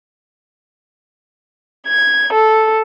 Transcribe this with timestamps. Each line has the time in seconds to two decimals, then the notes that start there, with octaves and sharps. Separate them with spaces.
1.86 G#6
2.31 A4